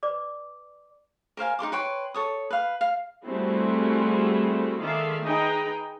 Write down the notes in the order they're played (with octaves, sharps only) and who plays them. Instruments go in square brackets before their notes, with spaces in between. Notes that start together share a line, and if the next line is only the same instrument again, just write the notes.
[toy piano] B4 D5 D6
[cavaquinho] A#4 C5 F5 G#5
D#4 A#4 C6 D6
B4 C#5 G5 C6
A4 C#5 D#6
B4 F5
F5
[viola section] G3 A3 C4 E4 F#4 G#4
D#3 G#3 A4 D5 E5 F5
D#4 G#4 B4 D#5 G5 A#5